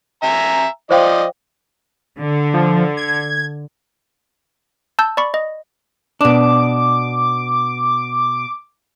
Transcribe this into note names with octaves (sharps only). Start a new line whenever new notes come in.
E5 G#5 A#5
F3 C5 D5 D#5 F5 G5
D3
F3
G#6
A5 E6 G6
D5 B5 C#6
D#5
B2 D4 D6